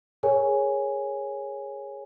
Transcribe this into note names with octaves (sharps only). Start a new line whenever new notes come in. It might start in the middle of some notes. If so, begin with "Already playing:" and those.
G#4 A#4 C#5 G#5